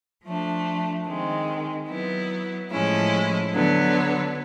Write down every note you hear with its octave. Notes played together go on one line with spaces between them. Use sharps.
F3 A3 D4
D#3 G#3 C4
F#3 B3 E4
A2 F3 G#3 C#4 E4
D3 F#3 B3